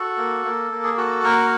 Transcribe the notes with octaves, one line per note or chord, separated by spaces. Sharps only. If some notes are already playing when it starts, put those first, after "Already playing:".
Already playing: F#4 A4
A#3
A#3
A#3
G#4
F#4 A4
A#3 A#4